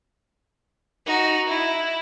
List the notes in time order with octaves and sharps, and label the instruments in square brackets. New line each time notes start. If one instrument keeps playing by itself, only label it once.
[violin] D#4 F#4
E4